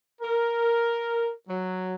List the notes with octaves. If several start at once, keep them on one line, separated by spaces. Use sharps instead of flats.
A#4
F#3